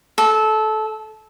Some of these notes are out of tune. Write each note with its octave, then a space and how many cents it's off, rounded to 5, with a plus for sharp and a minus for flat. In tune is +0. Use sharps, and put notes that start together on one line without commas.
A4 -20